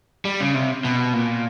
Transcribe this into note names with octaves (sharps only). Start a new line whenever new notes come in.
G3
C#3
C3
B2
A#2